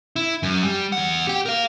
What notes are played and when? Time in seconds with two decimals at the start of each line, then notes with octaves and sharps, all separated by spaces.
0.16 E4
0.43 F#2
0.63 G3
0.92 E2 F#5
1.27 G4 G5
1.46 A#4 F5